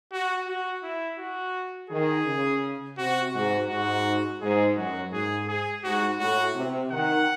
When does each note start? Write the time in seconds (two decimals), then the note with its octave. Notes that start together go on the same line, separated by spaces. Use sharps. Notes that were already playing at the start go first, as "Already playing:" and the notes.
0.12 F#4
0.48 F#4
0.83 E4
1.19 F#4
1.90 D#3 G#4
2.26 C#3
2.97 C3 F#4
3.33 G#2 F#4
3.69 G#2 F#4
4.41 G#2 G#4
4.77 F#2 F#4
5.12 G#2 G#4
5.48 G#4
5.84 G#2 F#4
6.20 A2 F#4
6.55 C3
6.91 D#3 F#5